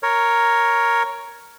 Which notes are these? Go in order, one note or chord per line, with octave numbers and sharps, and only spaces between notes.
A#4 C#5